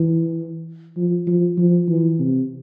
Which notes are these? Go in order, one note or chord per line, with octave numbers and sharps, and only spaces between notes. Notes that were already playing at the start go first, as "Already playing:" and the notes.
Already playing: E3
F3
F3
F3
E3
C3